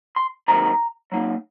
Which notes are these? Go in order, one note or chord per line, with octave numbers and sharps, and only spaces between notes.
C6
C3 D#3 F#3 A#3 D#4 A#5
F#3 A#3 D#4